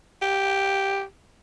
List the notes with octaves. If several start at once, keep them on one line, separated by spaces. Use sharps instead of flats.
G4